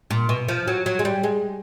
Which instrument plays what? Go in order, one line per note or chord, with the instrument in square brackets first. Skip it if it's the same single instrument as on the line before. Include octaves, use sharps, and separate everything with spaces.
[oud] A#2
B2
F3
F#3
F#3
G#3
G3
G#3